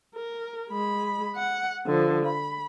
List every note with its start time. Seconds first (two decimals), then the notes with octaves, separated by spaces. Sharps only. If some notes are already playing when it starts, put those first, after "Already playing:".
0.15 A#4
0.69 G#3 B5
1.36 F#5
1.86 D3 F3
2.26 B5